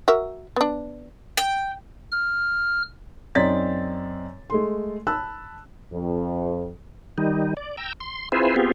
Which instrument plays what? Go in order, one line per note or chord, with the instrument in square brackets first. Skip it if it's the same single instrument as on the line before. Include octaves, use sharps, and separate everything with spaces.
[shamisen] F#4 A#4 E5
B3 D4
[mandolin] G5
[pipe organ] F6
[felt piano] F#2 C4 D#4 D5 A6 B6
G#3 A3 C6
A5 B5 E6 F#6
[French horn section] F2
[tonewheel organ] D#3 G3 D#4
D5
G5 A#5 E6
C6
C4 E4 F4 G#4 B4 C5
B3 C4 F4 G4 G#4